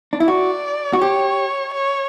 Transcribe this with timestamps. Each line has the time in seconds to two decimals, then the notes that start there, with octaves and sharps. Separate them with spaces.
0.13 D4
0.20 E4
0.28 F#4 D5
0.93 F#4
1.01 G4 C#5
1.74 C#5